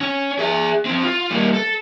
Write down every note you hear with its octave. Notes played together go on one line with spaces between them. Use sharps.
C#4
G#4 E5
F3 C4
F4
G3 A#3
A4